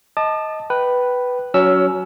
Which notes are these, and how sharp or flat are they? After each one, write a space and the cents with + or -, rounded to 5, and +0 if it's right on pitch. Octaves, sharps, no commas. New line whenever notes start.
D#5 +15 A5 +0 D6 +45
B4 +0 G5 -25
F#3 +0 C#4 +25 E6 +0